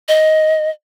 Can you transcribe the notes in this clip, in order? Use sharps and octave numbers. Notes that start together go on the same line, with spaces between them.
D#5